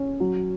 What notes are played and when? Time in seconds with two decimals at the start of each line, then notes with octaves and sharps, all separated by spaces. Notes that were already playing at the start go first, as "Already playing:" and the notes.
Already playing: C#4
0.20 F#3